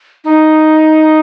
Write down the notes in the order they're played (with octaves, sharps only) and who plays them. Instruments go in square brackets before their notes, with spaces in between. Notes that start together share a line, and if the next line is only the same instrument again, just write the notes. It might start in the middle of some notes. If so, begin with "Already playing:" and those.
[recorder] D#4